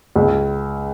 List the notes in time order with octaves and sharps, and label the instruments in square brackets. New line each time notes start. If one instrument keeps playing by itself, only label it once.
[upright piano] C#2